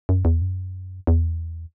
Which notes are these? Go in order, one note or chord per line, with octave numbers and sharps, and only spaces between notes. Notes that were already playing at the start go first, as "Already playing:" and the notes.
F#2
E2
F#2
E2